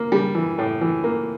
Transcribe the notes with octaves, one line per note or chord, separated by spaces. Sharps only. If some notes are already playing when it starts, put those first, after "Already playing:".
Already playing: A#3
G3
E3
A2
E3
A#3